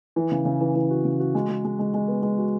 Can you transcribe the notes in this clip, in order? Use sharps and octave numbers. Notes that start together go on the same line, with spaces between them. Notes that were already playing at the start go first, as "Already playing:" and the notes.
E3
C#3
C#3
E3
E3
F#4
C#3
F#4
G#3
G#3
G#3
G#3
G#3
B3
G#3
F#4